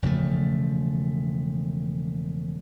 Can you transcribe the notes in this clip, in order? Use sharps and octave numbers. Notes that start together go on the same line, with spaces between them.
E1 C#3 F3 A3